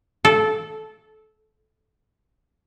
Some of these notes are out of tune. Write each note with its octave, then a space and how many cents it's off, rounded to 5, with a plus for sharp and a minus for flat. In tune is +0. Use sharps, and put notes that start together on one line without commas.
A4 -15